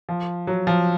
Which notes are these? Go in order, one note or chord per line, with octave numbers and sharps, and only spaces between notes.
F3
F#3
F3